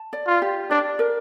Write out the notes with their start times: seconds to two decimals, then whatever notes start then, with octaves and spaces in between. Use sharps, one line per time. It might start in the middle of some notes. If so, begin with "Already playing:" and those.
Already playing: A5
0.13 D5
0.27 F4
0.42 G4
0.70 D4 D5
0.99 A#4